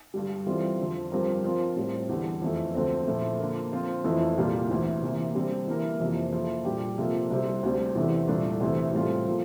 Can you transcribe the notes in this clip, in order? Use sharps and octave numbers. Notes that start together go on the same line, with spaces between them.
G2 D3 G3
E3 G3 C4 F4 A4
F2 D3 F3
G2 F3 C4 G4 A#4
F3 C4 F4 A#4
A2 G3 C4
E2 D3 G3
F2 E3 A3
D2 D3 F3 A3 C4
A#2 F3 A3 E4
D3 F3 A#3
F3 C4 F4 C5
F2 E3 A3 E4
C2 A#2 G3 A#3 F4
D2 C3 E3
C3 E3 A#3
D3 G3 C4
E3 G3 A#3 E4 A#4
F2 C3 E3 A#3
F3 A#3 E4 A4
A#2 G3 D4 G4
C3 F3 A#3 F4 A4
C2 C3 G3
D2 D3 G3 C4
E2 C3 E3 A3 D4
C2 A#2 A3 D4
D2 C3 E3
A2 G3 C4 F4 A4
F3 A#3 F4